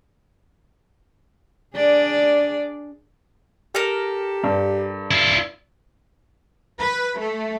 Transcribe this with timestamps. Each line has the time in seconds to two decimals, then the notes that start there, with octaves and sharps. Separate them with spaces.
1.75 D4 G#4 D5
3.75 G4 A4 A#4
4.44 G2
5.11 E4 F4
6.80 B4
7.18 A3